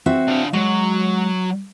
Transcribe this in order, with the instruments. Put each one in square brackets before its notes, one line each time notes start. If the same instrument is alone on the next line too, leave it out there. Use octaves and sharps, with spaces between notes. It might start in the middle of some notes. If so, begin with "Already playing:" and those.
[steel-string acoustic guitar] C4 F#4 E5
[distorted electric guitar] D3 F5
[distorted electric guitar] F#3 [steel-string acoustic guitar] G#3